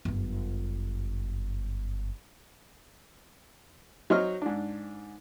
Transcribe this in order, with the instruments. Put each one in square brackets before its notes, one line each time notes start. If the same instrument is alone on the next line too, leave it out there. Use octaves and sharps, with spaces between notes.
[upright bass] G1 F#2
[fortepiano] F#3 D#4 C5 D#5 C#6 F6
G#2 D4